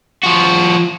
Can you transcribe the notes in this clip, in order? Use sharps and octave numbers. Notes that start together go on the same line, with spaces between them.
F3 F#4